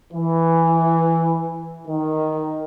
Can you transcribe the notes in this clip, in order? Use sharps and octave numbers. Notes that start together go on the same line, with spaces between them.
E3
D#3